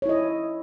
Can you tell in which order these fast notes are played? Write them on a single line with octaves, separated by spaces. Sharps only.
C#5 E4 D#5